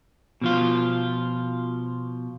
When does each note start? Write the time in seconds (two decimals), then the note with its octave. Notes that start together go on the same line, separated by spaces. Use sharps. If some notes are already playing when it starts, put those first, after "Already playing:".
0.41 B2 F3 F4